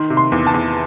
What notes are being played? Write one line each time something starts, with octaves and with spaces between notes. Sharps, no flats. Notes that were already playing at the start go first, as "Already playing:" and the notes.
Already playing: D#3 C6
C3
C6
E2
A5
E2